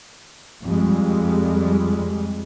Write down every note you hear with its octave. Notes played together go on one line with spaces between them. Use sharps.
F2 G3 G#3